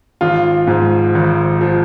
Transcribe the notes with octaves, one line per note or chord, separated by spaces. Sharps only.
G#1 F4
G#2 F3
G#1
F3